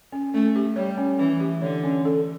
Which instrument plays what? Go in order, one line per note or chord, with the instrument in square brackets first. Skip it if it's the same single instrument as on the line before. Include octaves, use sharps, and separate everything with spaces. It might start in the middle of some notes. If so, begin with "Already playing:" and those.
[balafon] C#4
[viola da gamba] A3 [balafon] C#4
[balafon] G4
[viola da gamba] G3 [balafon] C#5
[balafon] C#4
[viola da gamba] E3 [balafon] C#4
[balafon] G4
[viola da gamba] D3 [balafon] C#5
[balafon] C#4
A4